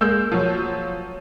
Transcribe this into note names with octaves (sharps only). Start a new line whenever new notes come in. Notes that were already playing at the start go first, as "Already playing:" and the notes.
G#3 A#3 E6 G6
F3 F#3